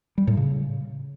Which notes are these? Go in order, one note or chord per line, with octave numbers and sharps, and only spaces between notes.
G3
A2
C#3